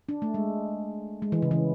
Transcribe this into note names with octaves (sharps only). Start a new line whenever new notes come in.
D4
A3
G#3
G#3
E3
C#3
E3